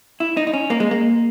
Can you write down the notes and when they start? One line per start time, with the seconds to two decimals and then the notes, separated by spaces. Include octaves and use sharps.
0.20 E4
0.37 D#4
0.47 D#4
0.53 C#4
0.70 A#3
0.80 G#3
0.91 A#3